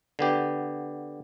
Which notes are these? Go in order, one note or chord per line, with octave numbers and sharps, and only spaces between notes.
D3 B3 G4